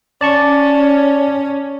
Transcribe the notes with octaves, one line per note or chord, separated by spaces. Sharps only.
C#4 D5 A5 C#6